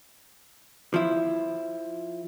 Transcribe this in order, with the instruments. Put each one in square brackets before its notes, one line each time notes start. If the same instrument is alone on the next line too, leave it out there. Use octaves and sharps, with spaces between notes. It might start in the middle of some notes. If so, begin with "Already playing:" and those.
[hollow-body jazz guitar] F3 E4